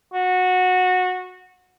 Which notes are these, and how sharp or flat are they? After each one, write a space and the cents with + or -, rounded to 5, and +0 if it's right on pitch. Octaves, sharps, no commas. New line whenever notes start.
F#4 -15